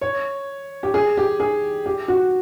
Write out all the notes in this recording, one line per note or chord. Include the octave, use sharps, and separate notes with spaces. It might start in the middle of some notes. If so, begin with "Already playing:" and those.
C#5
G4
G#4
G4
G#4
G4
F#4